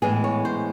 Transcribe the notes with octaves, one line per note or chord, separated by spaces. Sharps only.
A2 E3 G#3 B3 G#4
C#5
C5